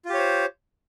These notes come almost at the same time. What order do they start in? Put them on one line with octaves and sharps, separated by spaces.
F4 G4 C#5 C5